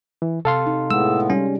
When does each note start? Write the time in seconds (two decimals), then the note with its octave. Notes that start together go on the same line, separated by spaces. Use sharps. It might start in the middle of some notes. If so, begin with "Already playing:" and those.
0.22 E3
0.45 C3 A4 F5 C6
0.66 D#4
0.91 A2 G#3 B3 E6
1.30 G3 C#4